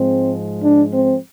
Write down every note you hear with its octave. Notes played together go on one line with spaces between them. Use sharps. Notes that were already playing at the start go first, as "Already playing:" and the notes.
Already playing: G#2 F3 G#3 C4
D4
C4